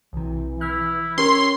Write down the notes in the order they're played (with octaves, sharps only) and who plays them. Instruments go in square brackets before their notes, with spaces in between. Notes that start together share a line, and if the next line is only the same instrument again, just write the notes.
[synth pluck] B1 C3 [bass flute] E3
[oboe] E4 [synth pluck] F6
[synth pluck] C#4 G4 A#4 [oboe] C#5 [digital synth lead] C6